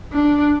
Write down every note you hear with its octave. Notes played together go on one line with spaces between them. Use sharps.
D4